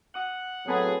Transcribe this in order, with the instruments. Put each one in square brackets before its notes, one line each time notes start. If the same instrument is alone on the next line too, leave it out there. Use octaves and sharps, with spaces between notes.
[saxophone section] F#5 [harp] D#6
[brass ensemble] A2 F#3 G#4 [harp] C4 A4 B4